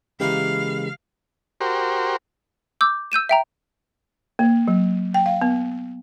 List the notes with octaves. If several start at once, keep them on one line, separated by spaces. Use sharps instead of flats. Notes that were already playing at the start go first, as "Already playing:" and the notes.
C#3 E3 G#3 A#3 E4 G4 F5
F#4 G4 A#4 C5
D6 E6 G6
E6 G6 D#7 E7
E5 G5 A#5
A#3
F#3
G5
F5
B3